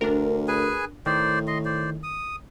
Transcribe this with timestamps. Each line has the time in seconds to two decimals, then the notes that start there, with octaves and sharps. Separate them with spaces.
0.01 D2 D4 A#4
0.48 G#4 B4 G#5
1.06 A2 D#3 C5 D5
1.47 D#5 C6
1.65 C5 D5
2.03 D#6